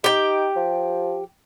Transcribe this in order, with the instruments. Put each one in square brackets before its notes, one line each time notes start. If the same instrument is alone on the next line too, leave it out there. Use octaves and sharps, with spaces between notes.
[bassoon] D#4 [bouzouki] G4 G5
[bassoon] F3